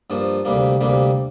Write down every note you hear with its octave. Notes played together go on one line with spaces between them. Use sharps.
G2 F3 A#3
D2 C3 G3 A#3
D2 C3 G3 A#3